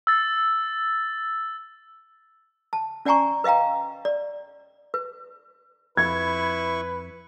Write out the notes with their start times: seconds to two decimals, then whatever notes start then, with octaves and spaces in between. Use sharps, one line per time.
0.07 E6 A6
2.73 A5
3.05 C#4 D5 F#5 G#5 A#5 C#6
3.44 B4 D#5 F5 G5 A#5
4.05 D5
4.94 B4
5.97 F2 E4 B4 C#6 G#6